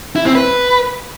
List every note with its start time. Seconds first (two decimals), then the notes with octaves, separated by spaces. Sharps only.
0.16 E4
0.25 C4
0.35 B4